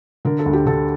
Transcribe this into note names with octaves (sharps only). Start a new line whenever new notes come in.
D3 A#4
A4
D2
G4
D3 A4